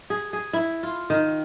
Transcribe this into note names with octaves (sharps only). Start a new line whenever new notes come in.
G#4
G#4
E4
F4
D#3